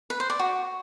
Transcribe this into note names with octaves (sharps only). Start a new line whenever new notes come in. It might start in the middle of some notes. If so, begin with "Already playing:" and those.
B4
C5
D5
F#4